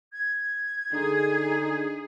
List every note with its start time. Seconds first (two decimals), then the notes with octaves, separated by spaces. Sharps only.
0.12 G#6
0.92 D3 D#4 G#4